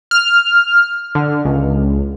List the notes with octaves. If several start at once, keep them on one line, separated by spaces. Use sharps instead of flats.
F6
D3
C#2